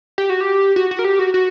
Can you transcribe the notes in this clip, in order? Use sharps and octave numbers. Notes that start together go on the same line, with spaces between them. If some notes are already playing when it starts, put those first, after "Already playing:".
G4
F#4
G4
F#4
F#4
A#4
G4
F#4
F#4